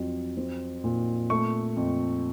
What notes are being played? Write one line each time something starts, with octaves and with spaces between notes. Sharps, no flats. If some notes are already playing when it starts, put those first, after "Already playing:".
Already playing: F2 F#3
C4
A#2
A3 C#6
F2